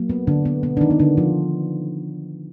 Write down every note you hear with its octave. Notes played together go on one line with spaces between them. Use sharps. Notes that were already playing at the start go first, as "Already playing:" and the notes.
Already playing: F#3 A#3
B3
D3 D4
B3
B2 G#3 B3
D4
D#3 D#4
B3
D3 D4
F3 F4